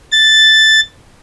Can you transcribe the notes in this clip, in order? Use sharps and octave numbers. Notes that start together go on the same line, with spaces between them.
A6